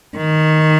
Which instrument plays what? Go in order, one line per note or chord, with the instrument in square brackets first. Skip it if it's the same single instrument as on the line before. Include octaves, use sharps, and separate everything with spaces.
[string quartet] D#3